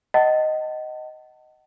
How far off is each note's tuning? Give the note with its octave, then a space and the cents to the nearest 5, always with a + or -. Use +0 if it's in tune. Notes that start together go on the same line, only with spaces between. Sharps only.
D#5 +0 F#5 +35 A5 +25